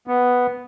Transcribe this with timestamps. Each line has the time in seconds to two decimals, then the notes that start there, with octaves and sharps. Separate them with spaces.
0.07 B3